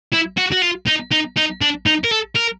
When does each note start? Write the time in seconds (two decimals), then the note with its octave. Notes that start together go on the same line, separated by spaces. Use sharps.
0.13 E4
0.38 F#4
0.52 F#4
0.62 F4
0.87 D#4
1.12 D#4
1.37 D#4
1.61 D4
1.86 D#4
2.04 A#4
2.11 A4
2.35 A#4